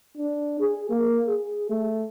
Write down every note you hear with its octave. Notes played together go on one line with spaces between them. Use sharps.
D4
G#4
A#3
G#4
A3